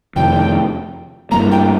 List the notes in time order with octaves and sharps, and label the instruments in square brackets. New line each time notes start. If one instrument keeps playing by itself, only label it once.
[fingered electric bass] F2 C3 D#3 [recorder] G5
[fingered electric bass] G2 G3 A#3 [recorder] A#5
[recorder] G5